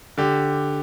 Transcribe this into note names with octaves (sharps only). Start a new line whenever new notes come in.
D3 G4